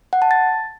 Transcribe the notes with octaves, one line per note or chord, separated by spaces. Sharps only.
F#5
A5
A6